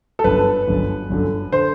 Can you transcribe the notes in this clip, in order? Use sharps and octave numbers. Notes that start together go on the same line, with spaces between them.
A4
G1 F#2 D3 B4
G1 F#2 D3
G1 F#2 D3
D3 C5